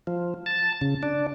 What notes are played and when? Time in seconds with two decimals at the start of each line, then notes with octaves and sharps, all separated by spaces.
0.07 F3
0.46 A5
0.81 C#3
1.03 D4